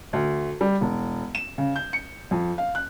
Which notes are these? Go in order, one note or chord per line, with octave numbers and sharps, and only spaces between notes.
D2
G3
E1
E7
C#3
G6
C#7
F2
F5
F#6